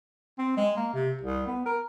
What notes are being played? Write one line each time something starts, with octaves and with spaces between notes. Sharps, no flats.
C4
G#3
A#3
C3
C2
B3
A#4